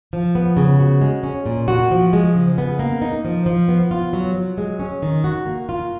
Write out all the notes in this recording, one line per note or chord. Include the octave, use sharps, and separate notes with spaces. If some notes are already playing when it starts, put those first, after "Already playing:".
F3
B3
C#3
F#4
G#3
C#4
A#2
F#4
F3
G#3
C#3
B3
A#3
D#4
F3
F3
B3
F4
F#3
F#3
G#3
C#4
D#3
F#4
A#3
F4